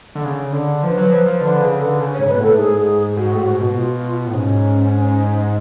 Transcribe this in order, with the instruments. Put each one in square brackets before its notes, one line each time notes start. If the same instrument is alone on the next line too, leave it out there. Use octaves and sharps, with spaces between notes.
[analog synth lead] D3
C#3
D3
[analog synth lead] F3 [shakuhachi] B4
[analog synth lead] F#3
F3
F3
[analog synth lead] D3 [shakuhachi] B4
[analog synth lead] C#3
D3
C#3
[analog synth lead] G#2 [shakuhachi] C#5
[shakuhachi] B4
[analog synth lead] B2
A2
[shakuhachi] A4
[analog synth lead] G#2 [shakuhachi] G#4
[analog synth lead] G#2 [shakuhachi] F#4
[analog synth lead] A2
G#2
B2
[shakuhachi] F4
[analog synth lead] A2
[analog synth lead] G#2 [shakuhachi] C#4